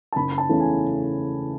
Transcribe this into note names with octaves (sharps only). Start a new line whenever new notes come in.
A5
F#1 B5
B5
A5
E2 C#3 E3 A3
G#5